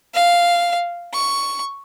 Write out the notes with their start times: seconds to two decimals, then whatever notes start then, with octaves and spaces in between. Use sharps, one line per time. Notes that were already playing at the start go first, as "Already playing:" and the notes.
0.14 F5
1.14 C#6